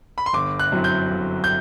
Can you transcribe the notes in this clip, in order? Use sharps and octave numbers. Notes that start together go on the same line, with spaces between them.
B5
C6
G1 D6
F#6
F#2 F#3 C4 E4
G6
G1
G6